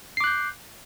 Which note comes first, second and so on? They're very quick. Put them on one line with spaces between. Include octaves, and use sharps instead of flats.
C7 D6 F#6 G6